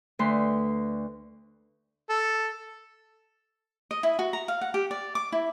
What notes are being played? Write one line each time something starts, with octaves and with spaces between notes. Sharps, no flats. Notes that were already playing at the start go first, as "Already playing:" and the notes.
D2 A3 B4 C6
A4
D#5
E4
F#4
A#5
F5
F#5
G4
D5
D6
E4